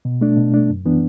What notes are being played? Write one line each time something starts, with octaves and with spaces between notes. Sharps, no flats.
B2
A3 D4
B2
A3 D4
F#2
E3 B3 D4